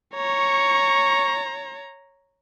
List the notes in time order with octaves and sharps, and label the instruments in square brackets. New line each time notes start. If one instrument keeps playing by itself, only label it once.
[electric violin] C#5 A#5 [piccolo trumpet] C#6